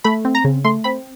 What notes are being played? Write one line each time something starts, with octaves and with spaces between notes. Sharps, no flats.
A3 B5
C4
A#5
C#3
A3 C6
C4 B5